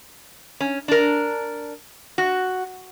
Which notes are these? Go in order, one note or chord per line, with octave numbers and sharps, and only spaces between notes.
C#4
D4 A#4
F#4